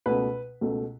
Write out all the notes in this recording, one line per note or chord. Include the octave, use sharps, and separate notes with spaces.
C#2 B2 A3 B4
C#2 B2 A3